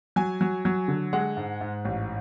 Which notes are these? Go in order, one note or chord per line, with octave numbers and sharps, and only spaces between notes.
F#3 G#5
F#3
F#3
D3
G#3 F#5
G#2
G#2
A1